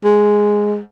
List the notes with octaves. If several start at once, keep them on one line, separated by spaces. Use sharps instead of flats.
G#3